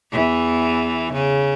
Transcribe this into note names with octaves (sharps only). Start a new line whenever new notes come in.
E2 E3
C#3